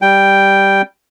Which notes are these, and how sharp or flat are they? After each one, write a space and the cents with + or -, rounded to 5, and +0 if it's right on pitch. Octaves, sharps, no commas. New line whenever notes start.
G3 +0 G5 +0